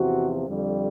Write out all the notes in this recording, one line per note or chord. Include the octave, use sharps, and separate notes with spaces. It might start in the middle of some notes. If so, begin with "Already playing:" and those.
Already playing: E2 C3 F3 F#4
F2 D3 G3